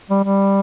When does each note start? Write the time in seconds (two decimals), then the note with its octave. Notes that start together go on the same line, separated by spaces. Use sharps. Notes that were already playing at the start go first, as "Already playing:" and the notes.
0.10 G3
0.24 G3